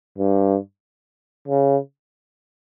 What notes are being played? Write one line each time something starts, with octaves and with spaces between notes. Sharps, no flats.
G2
C#3